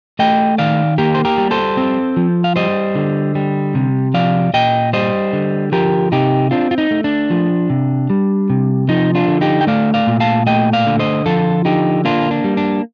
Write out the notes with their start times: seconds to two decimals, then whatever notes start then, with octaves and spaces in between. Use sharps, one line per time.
0.19 A3 D#5 G5
0.58 D#3 D5 F5
0.98 A#3 G4 A#4
1.15 C5
1.25 G4 A#4
1.38 G3
1.51 A4 C5
1.77 C4
2.17 F3
2.44 F5
2.56 G3 C5 D#5
2.96 D3
3.35 G3
3.75 C3
4.14 F3 D5 F5
4.54 A#2 D#5 G5
4.93 G3 C5 D#5
5.33 D3
5.72 F3 G4 A#4
6.12 C3 D#4 G4
6.51 C4 D4 F4
6.71 F4
6.78 D#4
6.91 A3
7.04 D4
7.30 F3
7.70 C3
8.10 G3
8.50 C3
8.89 F3 D#4
9.15 D4 F4
9.28 D3
9.41 D#4 G4
9.61 G5
9.67 A3 D5 F5
9.94 D5 F5
10.07 A#2
10.20 F5 A5
10.46 A3 D#5 G5
10.73 D5 F5
10.86 D3
10.99 C5 D#5
11.26 F3 F4 A4
11.65 D3 D#4 G4
12.05 A#3 D4 F4
12.31 D4
12.44 G3
12.57 D4